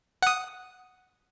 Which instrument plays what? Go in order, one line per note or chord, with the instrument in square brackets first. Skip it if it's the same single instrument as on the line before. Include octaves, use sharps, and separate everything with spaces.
[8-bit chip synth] F#5 D#6